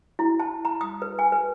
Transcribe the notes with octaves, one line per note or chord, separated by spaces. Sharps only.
E4
A5
A#5
D#6
B4
G#5
B4